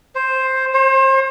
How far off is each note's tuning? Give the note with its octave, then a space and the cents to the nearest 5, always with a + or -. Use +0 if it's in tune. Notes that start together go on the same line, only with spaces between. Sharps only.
C5 +5
C5 +35